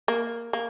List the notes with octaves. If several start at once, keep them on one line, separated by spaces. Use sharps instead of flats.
A#3
A#3